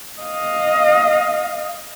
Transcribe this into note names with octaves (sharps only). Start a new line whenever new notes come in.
D#5 F5